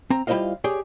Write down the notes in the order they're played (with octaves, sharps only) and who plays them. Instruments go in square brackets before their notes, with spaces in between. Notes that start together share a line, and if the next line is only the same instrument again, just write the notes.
[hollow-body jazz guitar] C4 A#5
G3 E4 F4 C5 D#5 F5
G4 G#4 C#5 D5